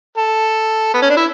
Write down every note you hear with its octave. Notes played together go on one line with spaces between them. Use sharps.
A4
B3
C#4
D4
E4